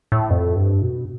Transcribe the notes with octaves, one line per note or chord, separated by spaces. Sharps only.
A2
F2
G2
B2